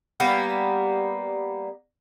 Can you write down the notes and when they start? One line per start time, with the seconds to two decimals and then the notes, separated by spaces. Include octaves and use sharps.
0.20 G3 A#3 B3